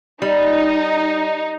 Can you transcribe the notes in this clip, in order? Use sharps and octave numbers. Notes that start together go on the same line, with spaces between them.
G3 D#4